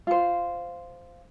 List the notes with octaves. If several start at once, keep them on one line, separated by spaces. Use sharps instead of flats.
F4 C5